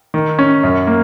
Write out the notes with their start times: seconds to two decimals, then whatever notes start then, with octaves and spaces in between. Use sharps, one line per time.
0.14 D#3
0.39 C#4
0.63 F#2
0.87 A#3